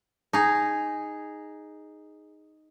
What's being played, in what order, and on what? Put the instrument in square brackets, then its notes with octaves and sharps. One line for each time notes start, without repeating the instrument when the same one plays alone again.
[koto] D#4 G#4